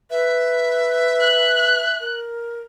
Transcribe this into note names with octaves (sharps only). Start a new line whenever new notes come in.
B4 E5
F#6
A#4